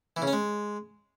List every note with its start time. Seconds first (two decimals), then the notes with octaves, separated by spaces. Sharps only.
0.17 E3
0.22 C#3
0.27 C#4
0.33 G#3